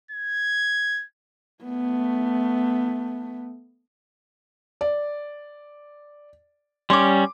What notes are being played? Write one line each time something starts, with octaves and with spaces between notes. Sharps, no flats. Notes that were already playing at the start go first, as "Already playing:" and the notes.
G#6
A3 B3
D5
G3 C#4 C6 D6